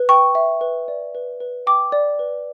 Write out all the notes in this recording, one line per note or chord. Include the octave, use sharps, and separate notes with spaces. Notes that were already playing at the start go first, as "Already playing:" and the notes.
Already playing: B4
G5 C#6
E5
B4
D5
B4
B4
G5 D6
D5
B4